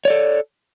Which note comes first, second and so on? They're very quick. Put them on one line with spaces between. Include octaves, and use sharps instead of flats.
C#5 D5 A4